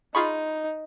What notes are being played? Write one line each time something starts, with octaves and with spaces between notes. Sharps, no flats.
D#4 F4 G#4 B5 C#6